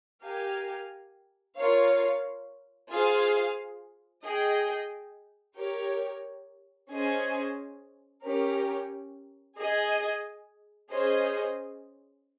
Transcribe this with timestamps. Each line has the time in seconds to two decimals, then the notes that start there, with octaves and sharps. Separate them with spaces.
0.23 G4 A#4 F5 G#5
1.57 F4 A#4 C#5 F5
2.90 F4 G#4 C5 F5
4.24 G#4 D#5 G5
5.57 G4 A#4 C#5
6.90 C#4 G#4 C5 D#5 G#5
8.25 C#4 G4 A#4
9.58 G#4 D#5 G#5
10.91 C#4 G#4 C5 D#5